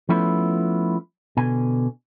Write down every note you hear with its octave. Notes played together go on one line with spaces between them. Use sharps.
F3 A3 B3 C#4 E4 F4
B2 D3 G#5